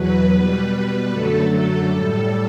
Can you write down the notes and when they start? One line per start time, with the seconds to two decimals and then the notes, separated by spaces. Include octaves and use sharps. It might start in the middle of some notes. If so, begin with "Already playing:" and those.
Already playing: E2 B2 F#3 B4
0.32 B2 G3
1.10 F#2 D3 F#3 A3 A4
1.49 A4
1.88 A2 G3